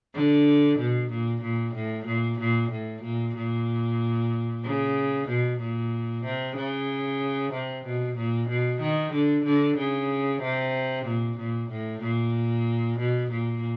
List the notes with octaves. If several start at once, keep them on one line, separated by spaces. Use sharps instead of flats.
D3
B2
A#2
A#2
A2
A#2
A#2
A2
A#2
A#2
C#3
B2
A#2
C3
C#3
C3
B2
A#2
B2
D#3
D3
D3
C#3
C3
A#2
A#2
A2
A#2
B2
A#2